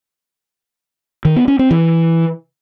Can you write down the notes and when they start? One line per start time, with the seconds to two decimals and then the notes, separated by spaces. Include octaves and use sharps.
1.25 D#3
1.36 B3
1.48 C#4
1.59 C4
1.71 E3